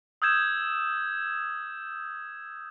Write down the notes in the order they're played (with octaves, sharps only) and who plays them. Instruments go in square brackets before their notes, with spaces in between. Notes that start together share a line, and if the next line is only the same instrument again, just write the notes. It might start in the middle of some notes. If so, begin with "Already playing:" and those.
[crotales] D#6 E6 G6 G#6 E7